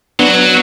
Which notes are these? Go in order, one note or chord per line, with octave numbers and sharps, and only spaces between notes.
F#3 B3 D4